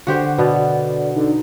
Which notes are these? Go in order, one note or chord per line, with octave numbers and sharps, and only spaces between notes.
D3 F#4 G4 C5 F#5
B2 B3 D5
D3 D#4